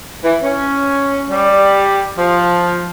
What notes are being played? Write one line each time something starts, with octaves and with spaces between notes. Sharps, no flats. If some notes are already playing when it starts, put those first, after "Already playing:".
E3
C#4
G3
F3